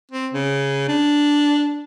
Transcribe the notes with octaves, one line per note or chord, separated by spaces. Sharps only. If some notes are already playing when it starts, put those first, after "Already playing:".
C4
C#3
D4